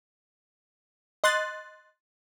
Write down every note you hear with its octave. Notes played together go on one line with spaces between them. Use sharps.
D#5 C6 F#6 A6